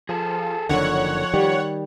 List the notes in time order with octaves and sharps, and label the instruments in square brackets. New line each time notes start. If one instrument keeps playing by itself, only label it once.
[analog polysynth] F3 [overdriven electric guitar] G#4 A4
[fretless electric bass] F#1 D3 D#3 [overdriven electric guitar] F2 [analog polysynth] C#5 F#5
[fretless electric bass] D#3 G3 [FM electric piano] G4